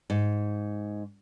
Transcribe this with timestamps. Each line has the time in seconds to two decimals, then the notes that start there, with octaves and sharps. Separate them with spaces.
0.10 G#2